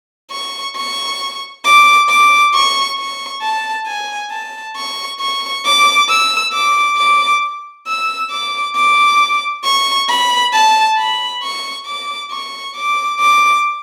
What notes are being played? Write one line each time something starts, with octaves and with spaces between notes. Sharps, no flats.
C#6
C#6
D6
D6
C#6
C#6
A5
G#5
A5
C#6
C#6
D6
E6
D6
D6
E6
D6
D6
C#6
B5
A5
B5
C#6
D6
C#6
D6
D6